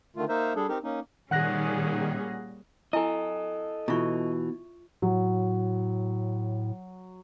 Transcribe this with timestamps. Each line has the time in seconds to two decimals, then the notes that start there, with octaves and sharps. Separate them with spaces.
0.16 D3 D#3 A3 F4
0.29 A#3 D#4 A#4 C5 E5
0.56 G3 D4 G#4 A4
0.69 C4 D#4 G4 A#4
0.84 A#3 C#4 D#4
1.31 A#2 D#3 G3 C#4 G#4 F#5 F#6 A#6
2.93 E4 A4 D#5 G#5
3.88 B2 E3 F4 E5 C#6
5.02 A2 F#3